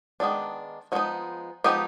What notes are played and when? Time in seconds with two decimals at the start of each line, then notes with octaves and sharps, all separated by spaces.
0.20 D#3 G#3 B3 D4
0.92 F3 G#3 B3 D#4 F#4
1.64 F3 G#3 B3 D#4 G4